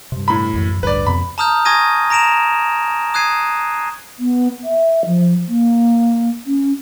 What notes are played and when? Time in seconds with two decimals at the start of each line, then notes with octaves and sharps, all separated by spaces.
0.12 G2 C3
0.28 A2 B5
0.53 C#2 F#2 E3
0.83 A1 D2 G2 B4 D5
1.07 F2 C3 B3 B5
1.38 A5 A#5 D#6 F6 G6
1.65 G#5 C#6 D#6 G#6 A#6 D#7
2.10 A#5 A#6 D7 E7 F7
3.14 D#6 F#6 G#6 C7 D#7
4.19 B3
4.64 E5
5.06 F3
5.48 A#3
6.46 C#4